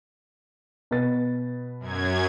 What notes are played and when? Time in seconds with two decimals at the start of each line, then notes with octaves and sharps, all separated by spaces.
0.91 B2 B4 A6
1.80 F#2 G#6